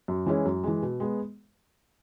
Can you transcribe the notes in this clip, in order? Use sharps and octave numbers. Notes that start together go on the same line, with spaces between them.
F#2
E3 G#3 C#4 E4
F#2
E3 G#3
B2
G#3 B3